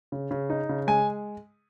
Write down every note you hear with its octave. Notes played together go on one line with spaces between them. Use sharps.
C#3
C#3
D#4
C#3
G#3 G#5